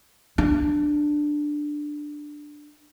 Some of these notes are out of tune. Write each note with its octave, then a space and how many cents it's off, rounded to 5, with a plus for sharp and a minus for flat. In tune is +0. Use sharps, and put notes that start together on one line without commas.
D4 +10